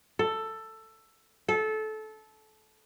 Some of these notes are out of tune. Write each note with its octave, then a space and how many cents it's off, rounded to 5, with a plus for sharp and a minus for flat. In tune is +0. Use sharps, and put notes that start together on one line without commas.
A4 +10
A4 -20